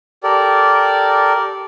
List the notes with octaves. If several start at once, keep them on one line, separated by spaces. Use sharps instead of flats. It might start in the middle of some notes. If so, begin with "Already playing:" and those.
G4 A4 A#4 D5